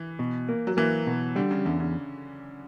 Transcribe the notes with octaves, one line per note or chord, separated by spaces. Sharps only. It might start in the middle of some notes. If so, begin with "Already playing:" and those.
Already playing: E3
B2
A#3
F#3
E3 A#3
B2
D3 G3
C#3
E2 D3
C#3